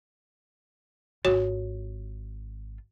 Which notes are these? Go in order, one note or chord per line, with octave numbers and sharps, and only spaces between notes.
G#1 F4 F#4 C#5